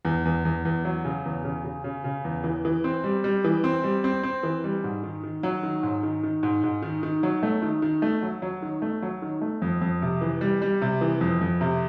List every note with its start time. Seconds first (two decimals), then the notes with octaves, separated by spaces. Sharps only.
0.05 E2
0.25 E2
0.45 E2
0.65 E2
0.85 F#3
1.05 C#3
1.25 E2
1.45 C#3
1.64 C#3
1.84 C#3
2.04 C#3
2.25 E2
2.44 E3
2.65 E3
2.84 C4
3.04 G3
3.24 G3
3.44 E3
3.64 C4
3.84 G3
4.04 C4
4.23 C4
4.43 E3
4.64 G3
4.84 G#2
5.04 D#3
5.24 D#3
5.43 F#3
5.63 D#3
5.83 G#2
6.03 D#3
6.23 D#3
6.43 G#2
6.64 G#2
6.83 D#3
7.03 D#3
7.23 F#3
7.43 A3
7.62 D#3
7.82 D#3
8.02 A3
8.22 F#3
8.42 F#3
8.62 D#3
8.82 A3
9.02 F#3
9.22 D#3
9.41 A3
9.62 F2
9.81 F2
10.02 C3
10.21 E3
10.41 G3
10.62 G3
10.82 C3
11.01 E3
11.21 F2
11.41 F2
11.61 C3